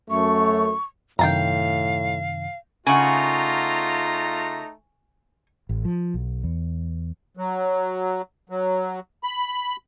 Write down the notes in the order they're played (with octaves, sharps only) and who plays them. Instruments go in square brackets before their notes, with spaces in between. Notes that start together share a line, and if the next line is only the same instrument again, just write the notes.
[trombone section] F#2 A3 [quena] C#6
[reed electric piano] F#2 C3 D#3 [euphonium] A2 [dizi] F5 [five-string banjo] G5 A5 A#5
[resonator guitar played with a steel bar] C#3 F#5 [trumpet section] A3 D#4 A#5 [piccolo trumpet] F4 [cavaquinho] G#5 C#6
[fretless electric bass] A1
F3
B1
E2
[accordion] F#3
F#3
B5